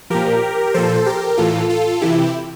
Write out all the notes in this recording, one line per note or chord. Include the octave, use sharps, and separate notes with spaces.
A#2 F3 G4 A#4
A#2 F3 A4 C5
G4 A#4
A2 E3 F4 A4
F4 A4
C3 E3 E4 G4